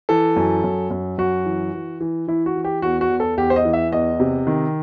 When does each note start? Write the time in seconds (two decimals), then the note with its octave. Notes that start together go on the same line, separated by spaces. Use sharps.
0.09 E3 A4
0.36 F#2
0.64 F#2
0.90 F#2
1.18 F#2 F#4
1.45 E3
1.74 E3
2.00 E3
2.28 E3 E4
2.46 F#4
2.56 E3
2.64 G4
2.82 E2 F#4
3.01 F#4
3.10 E2
3.20 A4
3.38 E2 G4
3.50 C5
3.56 D#5
3.65 E3
3.73 E5
3.92 E2 D#5
4.20 C3
4.47 D#3